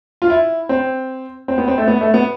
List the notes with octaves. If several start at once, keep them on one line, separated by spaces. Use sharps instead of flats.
F4
E4
C4
C4
B3
C4
A3
B3
A3
B3